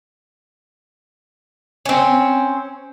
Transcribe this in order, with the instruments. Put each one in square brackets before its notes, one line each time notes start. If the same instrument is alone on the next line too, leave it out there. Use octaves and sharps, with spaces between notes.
[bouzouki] C4 C#4